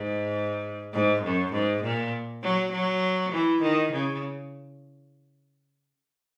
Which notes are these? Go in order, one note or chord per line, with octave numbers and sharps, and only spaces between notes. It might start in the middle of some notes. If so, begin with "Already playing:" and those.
Already playing: G#2
G#2
F#2
G#2
A#2
F#3
F#3
E3
D#3
C#3